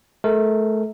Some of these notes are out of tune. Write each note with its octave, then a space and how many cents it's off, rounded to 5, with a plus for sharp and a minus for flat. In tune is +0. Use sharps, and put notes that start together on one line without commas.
A3 -30 A#4 -25